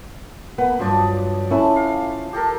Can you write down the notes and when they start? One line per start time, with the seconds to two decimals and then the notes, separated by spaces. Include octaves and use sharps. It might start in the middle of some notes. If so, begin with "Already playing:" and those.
0.58 A#3 B3 B4
0.79 G2 F3 F#3 D5 D#6
1.50 A3 C#4 E4 B4
1.76 F5
2.33 G4 A4 A#4